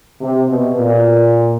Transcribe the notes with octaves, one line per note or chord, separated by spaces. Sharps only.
C3
B2
A#2